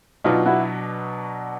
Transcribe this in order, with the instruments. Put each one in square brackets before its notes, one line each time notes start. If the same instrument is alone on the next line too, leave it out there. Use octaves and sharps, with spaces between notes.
[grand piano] B2 F#3 B3 D4 [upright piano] D#4 F4
[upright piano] E4 F#4